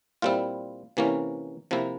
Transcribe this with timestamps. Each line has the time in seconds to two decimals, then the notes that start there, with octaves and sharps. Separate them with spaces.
0.22 A#2 G3 C4 E4 F4
0.97 C3 E3 A#3 C#4
1.71 C3 F3 A#3 E4